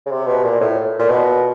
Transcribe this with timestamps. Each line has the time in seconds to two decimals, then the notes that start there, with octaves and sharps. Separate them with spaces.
0.06 C#3
0.11 C3
0.27 B2
0.43 A#2
0.60 A2
0.99 A#2
1.09 B2